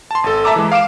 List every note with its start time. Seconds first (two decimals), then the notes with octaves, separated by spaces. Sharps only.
0.11 A5 C6
0.24 G#1 A4
0.44 E5 A5 A#5 D6 E6
0.56 E3 G#3
0.72 F5 D6 D7 E7